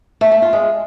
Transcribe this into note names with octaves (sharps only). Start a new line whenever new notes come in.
A3
A3
F4
G#3